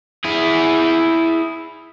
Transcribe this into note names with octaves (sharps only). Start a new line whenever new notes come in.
E4 G#4